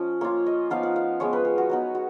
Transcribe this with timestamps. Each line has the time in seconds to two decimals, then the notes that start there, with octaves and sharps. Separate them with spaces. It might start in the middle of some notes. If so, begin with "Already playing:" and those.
Already playing: F3 C#4 D#5
0.21 A#3 F4 C#5
0.46 D#5
0.70 F3 B3 D#4 F5
0.83 F#5
0.96 F5
1.20 F3 G#3 B3 C#5
1.33 B4
1.45 G#4
1.58 F#4
1.70 F#3 B3 D#4
1.95 F#4